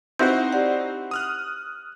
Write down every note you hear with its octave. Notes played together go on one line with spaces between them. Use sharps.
C4 D#4 E4 F#4 C5 G6
G4 D5 F#5
D#6 F6 F#6